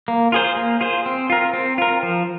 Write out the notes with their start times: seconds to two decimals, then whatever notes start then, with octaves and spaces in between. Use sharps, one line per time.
0.08 A#3
0.32 F4 G#4 C5
0.56 A#3
0.81 F4 G#4 C5
1.06 C4
1.30 F4 A#4
1.53 C4
1.78 F4 A#4
2.03 F3